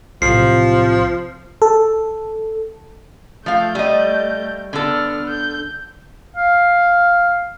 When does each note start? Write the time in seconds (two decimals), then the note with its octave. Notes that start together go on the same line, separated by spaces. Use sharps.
0.22 B1 A2 C3 F3 C7
1.62 A4
3.46 F3 A3 F5 G6
3.75 G3 D#5
4.73 D3 B3 A4 F6
5.30 G6
6.36 F5